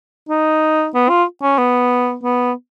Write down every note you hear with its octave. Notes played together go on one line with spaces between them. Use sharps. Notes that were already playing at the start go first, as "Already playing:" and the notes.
D#4
B3
F4
C#4
B3
B3